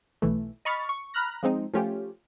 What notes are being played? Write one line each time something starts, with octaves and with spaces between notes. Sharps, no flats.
B1 E3 A3
D#5 B5 C#6 F6 A6
C#6
A#5 B5 F6 F#6 A#6
F3 G#3 C4 D#4
F3 A3 C#4 F4 G4